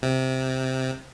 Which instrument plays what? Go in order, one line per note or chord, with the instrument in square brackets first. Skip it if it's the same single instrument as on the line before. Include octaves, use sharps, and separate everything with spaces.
[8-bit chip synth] C3